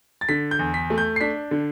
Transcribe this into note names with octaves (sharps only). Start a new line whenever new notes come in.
A6
D3 B6
G6
E2
B6
A3
G6
C7
D4 B6
D3